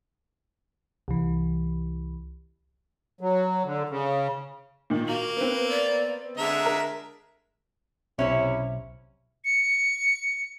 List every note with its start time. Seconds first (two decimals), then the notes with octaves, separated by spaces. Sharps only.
1.08 C2 E3
3.21 F#3
3.64 D3
3.89 C#3
4.90 A#2 D#3
5.08 A#3 F#4 F#7
5.37 B3 C4 B4
5.70 D5
6.37 D3 G#3 E5 A#5
6.66 A#4
8.19 B1 C3 C#4 E4 C#5 E5
9.45 C#7